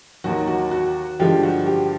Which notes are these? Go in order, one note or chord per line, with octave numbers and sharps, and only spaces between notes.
D#2 D#3 F#3 F#4
F#4
F#4
G2 D3 F3 G#3 G4
F#4
G4